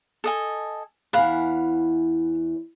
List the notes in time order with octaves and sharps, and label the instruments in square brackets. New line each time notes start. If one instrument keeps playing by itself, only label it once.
[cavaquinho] A4 D#5 G#5
[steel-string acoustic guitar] E2 E3 [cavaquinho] F5 F#5 B5